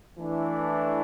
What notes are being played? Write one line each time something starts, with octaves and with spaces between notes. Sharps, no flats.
E3 A3 D4